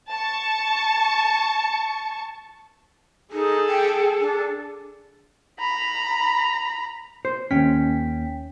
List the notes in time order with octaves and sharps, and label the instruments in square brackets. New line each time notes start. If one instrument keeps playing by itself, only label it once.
[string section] A5 C#6
[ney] D#4 [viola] G#4 A4
[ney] G5
D4
[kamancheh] A#5 B5
[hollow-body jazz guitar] C5
[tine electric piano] D#2 G5 B6 [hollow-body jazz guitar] C#4